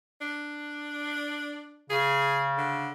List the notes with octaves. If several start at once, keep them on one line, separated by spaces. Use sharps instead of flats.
D4
C#3 G#4
D3